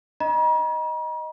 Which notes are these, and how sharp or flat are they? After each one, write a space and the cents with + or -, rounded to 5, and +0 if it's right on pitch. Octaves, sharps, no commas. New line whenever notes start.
D#5 +0 A#5 +45